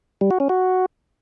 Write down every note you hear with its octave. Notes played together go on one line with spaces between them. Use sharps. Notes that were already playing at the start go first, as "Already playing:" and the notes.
G3
F#4
C#4
F#4